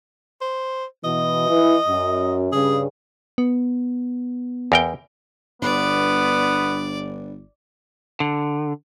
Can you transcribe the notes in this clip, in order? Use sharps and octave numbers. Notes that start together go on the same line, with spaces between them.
C5
B2 E3 D#5
E3
F#2
G2 C#3 G#4
B3
E2 A#4 G5
G1 B3 D4 B4 D5
D3